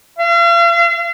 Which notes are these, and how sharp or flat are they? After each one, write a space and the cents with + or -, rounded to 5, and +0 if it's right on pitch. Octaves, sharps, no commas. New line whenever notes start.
F5 -40